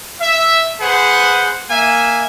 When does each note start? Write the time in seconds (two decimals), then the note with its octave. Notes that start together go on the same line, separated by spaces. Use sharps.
0.21 E5
0.81 G#4 B4 C5 F#5
1.70 A#3 E5 G#5